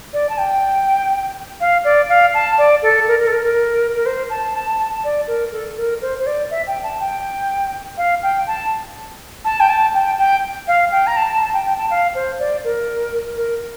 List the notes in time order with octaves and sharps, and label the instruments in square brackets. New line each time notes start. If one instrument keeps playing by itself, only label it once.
[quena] D5
A5
G5
F5
D5
F5
A5
D5
A4
A#4
A#4
A4
A#4
A#4
A#4
C5
A5
A5
A5
D5
A#4
A4
A#4
C5
C5
D5
E5
G5
A5
G5
F5
G5
A5
A5
G5
A5
G5
G5
F5
G5
A#5
A5
A5
G5
G5
A5
F5
C5
D5
A#4
A#4